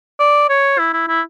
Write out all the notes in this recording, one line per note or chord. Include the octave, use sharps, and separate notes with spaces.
D5
C#5
E4
E4
E4